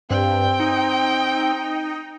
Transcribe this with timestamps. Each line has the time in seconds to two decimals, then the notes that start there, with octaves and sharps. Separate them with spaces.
0.10 G2 C4 G5
0.60 D#4